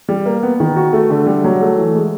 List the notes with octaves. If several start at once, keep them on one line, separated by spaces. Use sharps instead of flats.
G3
A#3
B3
D#3
F#4
A3
D3
G3
F#3
A3
E3
G#3